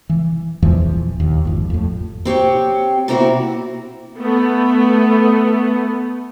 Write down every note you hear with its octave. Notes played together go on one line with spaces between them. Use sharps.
E3
E2 A#2 E3 F3
D#2
G#1 F2
F2 A2
C4 G4 C#5 G5
A#2 A#3 C4 D#4 E4 F#4
A3 B3